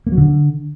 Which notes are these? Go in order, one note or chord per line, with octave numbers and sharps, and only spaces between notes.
A#3
F#3
D3